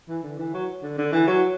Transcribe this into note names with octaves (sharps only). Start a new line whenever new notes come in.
E3
D3
E3
F#3
D3
D3
E3
F#3